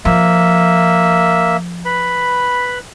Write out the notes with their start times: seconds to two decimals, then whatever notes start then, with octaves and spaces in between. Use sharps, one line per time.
0.05 F3 A#3 E5
1.85 B4 B5